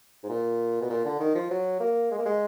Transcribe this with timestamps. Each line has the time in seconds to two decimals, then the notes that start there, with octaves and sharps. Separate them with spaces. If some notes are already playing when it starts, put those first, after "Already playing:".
0.23 G#2
0.29 A#2
0.81 B2
0.90 A#2
1.05 D3
1.20 D#3
1.35 F3
1.51 F#3
1.80 A#3
2.11 G#3
2.18 A#3
2.26 G#3